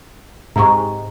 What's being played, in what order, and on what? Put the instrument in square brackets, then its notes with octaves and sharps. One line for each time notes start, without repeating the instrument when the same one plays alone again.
[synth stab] G#2 C3 G#3 [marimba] A#5 C#6